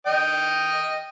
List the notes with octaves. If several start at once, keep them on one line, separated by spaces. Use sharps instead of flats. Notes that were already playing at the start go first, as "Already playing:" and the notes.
D#5 G5